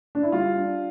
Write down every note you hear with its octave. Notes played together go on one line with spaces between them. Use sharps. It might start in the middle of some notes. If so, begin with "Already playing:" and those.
D4
E4
G3 F4
D4